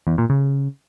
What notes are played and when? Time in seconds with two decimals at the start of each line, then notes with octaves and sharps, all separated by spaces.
0.07 E2
0.18 A#2
0.30 C#3